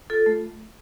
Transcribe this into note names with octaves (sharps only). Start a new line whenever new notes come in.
F4 A4
A3